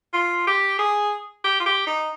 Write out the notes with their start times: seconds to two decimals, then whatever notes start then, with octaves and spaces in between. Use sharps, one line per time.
0.13 F4
0.47 G4
0.79 G#4
1.44 G4
1.60 F4
1.66 G4
1.87 D#4